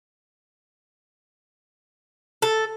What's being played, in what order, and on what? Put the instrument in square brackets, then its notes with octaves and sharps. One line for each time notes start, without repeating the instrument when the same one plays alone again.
[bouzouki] A4